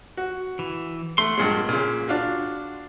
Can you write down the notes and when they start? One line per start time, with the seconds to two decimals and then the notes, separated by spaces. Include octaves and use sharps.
0.17 F#4
0.59 E3
1.18 A3 F#5 C6
1.37 G2 A#2 G#3
1.69 A#2 C#3
2.08 D4 F4 F#4